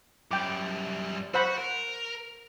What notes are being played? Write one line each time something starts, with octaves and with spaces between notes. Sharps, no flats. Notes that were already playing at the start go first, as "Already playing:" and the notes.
F#2 G3 G5 D6
F#4 C5 F#5 B5
A#4